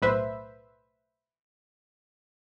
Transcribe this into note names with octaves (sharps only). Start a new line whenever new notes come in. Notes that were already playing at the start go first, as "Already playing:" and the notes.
B1 A2 B4 C5 E5